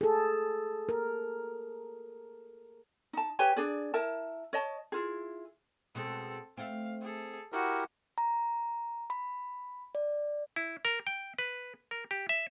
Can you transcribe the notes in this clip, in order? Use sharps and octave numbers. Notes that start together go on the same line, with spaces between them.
G#4 A4
A#4
D#4 A5
G4 B4 C#5 G#5
D4 G#4 D5
E4 A#4 A5
C#5 D#5 A5
E4 F4 G#4
B2 G#3 C4 A4
A3 C4 F5
G#4 A4
E4 F#4 G4 A#4
A#5
B5
D5
E4
A#4
G5
B4
A#4
G4
E5